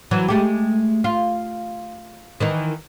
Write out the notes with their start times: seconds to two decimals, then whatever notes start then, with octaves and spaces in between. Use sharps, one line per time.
0.11 E3 F#3
0.28 G#3 A3 G4
1.04 F4
2.40 D#3 E3 D#4